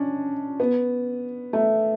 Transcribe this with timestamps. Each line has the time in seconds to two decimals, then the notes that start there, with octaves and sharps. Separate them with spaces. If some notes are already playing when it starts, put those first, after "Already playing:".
Already playing: C#4 D4
0.60 B3
1.53 A3